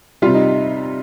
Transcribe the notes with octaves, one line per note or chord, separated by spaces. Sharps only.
C3 G3 F4
D#4